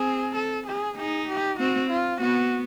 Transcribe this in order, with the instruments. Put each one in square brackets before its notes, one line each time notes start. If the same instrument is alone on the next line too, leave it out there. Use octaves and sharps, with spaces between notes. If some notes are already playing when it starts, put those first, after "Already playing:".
Already playing: [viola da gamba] C4 [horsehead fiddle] G#4
[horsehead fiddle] A4
G#4
[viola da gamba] D#4 [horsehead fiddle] G#4
[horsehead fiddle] G4
[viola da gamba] C4 [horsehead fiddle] F#4
[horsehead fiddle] F4
[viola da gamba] B3 [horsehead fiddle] F#4